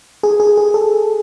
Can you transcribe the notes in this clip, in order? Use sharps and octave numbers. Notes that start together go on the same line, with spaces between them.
G#4
G#4
G#4
A4